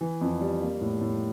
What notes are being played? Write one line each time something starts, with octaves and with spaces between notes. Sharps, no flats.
E3
F2
G3
A#3
A2
A2